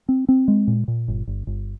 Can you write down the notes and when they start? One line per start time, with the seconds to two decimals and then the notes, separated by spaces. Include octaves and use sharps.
0.09 C4
0.29 C4
0.48 G#3
0.68 A#2
0.88 A#2
1.08 G1
1.27 G1
1.47 G1